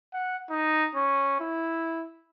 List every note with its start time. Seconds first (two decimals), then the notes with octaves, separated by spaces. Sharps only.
0.13 F#5
0.50 D#4
0.95 C#4
1.40 E4